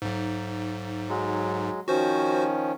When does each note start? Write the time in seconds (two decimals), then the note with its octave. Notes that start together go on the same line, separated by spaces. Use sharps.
0.02 B1 G#2
1.09 F#3 G#3
1.88 D#3 F3 C#4 F#4 C5